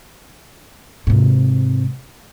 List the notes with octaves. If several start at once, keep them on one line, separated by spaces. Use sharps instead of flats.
G#2 C3